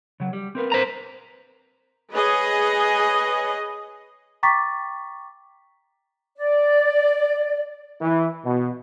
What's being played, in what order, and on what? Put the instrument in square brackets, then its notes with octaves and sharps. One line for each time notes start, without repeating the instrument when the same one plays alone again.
[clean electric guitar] C#3 F#3
G3
C4 A#4 B4
[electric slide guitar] C5 A#5
[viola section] G#4 B4 C#5 D#5
[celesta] G5 A#5 C#6 D6 A6 B6
[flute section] D5
[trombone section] E3
B2